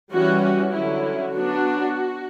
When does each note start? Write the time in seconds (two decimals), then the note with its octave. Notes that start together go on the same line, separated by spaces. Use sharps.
0.13 E3 G3 C#4 F#4
0.43 F#4
0.73 D3 F#3 C#4 E4
1.34 F#3 B3 D4 F#4